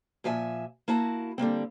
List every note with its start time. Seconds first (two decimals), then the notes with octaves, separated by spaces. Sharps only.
0.24 A#2 F3 E5 G#5
0.88 A#3 E4 F#4 A5
1.38 D3 G3 A#3 C4